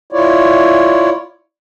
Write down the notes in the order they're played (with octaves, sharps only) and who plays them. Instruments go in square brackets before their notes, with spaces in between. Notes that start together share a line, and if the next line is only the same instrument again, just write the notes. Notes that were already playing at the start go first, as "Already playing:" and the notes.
[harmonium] E4 F4 C#5 D5